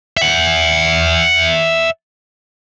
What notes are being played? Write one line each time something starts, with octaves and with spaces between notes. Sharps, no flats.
E5 F#5